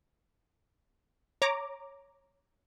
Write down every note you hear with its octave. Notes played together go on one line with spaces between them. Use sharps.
C#5 A#5 D6